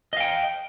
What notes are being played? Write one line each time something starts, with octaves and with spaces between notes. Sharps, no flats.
D#5 F5 G5